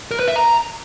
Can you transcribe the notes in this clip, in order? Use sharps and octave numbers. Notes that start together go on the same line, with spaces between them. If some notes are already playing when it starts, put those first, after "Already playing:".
A#4
B4
E5
A#5